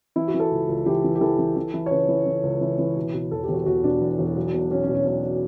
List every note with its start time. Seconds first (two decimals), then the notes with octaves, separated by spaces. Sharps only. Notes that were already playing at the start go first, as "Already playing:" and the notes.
0.16 E3 E4
0.28 F#4
0.34 E3
0.40 A4
0.51 C#2
0.69 C#2
0.86 E3 G4
1.04 E3
1.15 G4
1.21 E3 A4
1.39 E3
1.56 E3
1.74 E3
1.86 C#5
1.91 C#3 B4
2.08 E3
2.26 E3
2.43 C#2
2.61 E3
2.79 E3
2.96 B2
3.14 B2
3.31 E1 A4
3.43 G4
3.49 E1
3.54 F#4
3.66 E1 F#4
3.84 B2 D4
4.01 E2
4.19 E1
4.36 B1
4.54 B1
4.71 B1 C#4
4.83 C#4
4.89 B2
4.95 C#4
5.06 B1 C#4